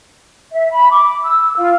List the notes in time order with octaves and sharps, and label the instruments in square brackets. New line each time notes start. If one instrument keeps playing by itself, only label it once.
[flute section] E5
B5
D6
E6
F4